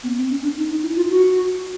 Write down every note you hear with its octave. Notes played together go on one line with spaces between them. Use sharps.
B3
C4
C#4
D4
D#4
D#4
E4
F4
F#4